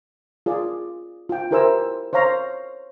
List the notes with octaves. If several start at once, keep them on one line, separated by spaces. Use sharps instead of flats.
F4 G#4 D5
F4 G5
E4 G4 A#4 C5 G#5 E6
C5 C#5 F5 A#5 C6